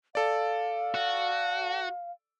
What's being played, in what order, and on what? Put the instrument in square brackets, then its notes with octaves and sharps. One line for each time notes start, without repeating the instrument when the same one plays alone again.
[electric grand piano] A4 D5 [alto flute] F5
[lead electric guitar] F#4